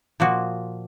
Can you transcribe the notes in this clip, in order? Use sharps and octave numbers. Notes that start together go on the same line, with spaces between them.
A#2 F3 A#3 F#4